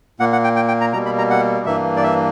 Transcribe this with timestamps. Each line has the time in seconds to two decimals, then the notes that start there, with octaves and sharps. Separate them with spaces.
0.20 A#2 A#3 F#5
0.32 F#5
0.44 G5
0.56 G5
0.68 G5
0.81 A#5
0.93 B2 G3 A#3 A#5
1.06 B5
1.18 A#5
1.30 F#5
1.66 G2 E3 A#3 E5
1.97 D5
2.03 E5